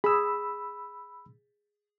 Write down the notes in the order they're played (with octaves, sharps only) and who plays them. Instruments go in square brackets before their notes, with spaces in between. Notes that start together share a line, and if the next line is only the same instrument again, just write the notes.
[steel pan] G#4 [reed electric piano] B5 E6